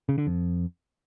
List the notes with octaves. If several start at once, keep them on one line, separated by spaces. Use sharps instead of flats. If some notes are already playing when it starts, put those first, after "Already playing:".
C#3
D3
F2